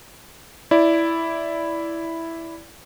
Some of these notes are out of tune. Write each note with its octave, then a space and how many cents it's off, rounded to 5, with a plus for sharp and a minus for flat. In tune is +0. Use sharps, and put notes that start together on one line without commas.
E4 +0 D5 -10